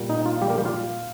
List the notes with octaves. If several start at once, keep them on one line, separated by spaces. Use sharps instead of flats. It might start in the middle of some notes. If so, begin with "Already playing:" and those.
Already playing: A#2 G3 A#3
D#4
F4
G3 G4
A#3 A#4
G3 G4
F4 F5